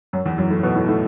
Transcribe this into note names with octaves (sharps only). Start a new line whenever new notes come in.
F#2 F#3
E2 E3
F#2 F#3
A2 A3
B2 B3
A2 A3
A2 A3